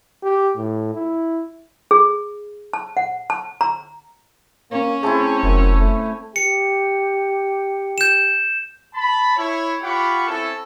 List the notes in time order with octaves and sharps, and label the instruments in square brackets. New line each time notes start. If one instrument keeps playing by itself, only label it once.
[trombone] G4
A2
E4
[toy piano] G#4
A5
F#5
A5
A#5
[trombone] A#3 [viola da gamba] C#4
[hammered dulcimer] A3 C4 E4 [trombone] G#4
[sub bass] F1 [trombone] F#2
[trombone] A3
[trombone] G4 [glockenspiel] C#7
[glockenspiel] G6 E7
[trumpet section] A5 B5
E4 C#5
F4 G4 F#5 B5 C#6
C4 C#4 E4 A4